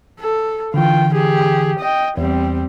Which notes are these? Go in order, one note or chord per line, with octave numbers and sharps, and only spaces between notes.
A4
D3 E3 F4 G5
G4 G#4
D#5 G5
E2 G3 C4